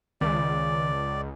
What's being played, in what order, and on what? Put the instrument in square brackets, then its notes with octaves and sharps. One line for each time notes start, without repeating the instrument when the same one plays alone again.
[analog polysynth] C#2 [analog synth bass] D#3 [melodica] D5